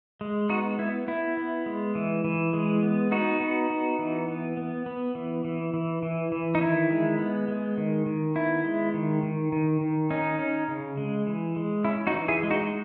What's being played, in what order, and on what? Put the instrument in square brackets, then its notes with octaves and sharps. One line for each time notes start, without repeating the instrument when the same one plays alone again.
[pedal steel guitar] G#3
B3 D#4 F#4
B3 E4
B3 E4
B3
G#3
E3
E3
G#3
B3
B3 D#4 F#4
B3
B3
E3
B3
B3
B3
E3
E3
E3
E3
E3
D#4
D#3 E4
G#3
B3
G#3
D#3
D#3
B3 E4
G#3
D#3
D#3
D#3
D#3
C#4 D#4
C#4
C#3
G#3
E3
G#3
C#4 E4
D#4 F#4
E3
E4 G#4
G#3
D#4 F#4